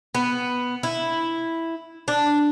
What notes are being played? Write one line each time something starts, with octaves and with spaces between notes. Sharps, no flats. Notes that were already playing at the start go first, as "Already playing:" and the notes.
B3
E4
D4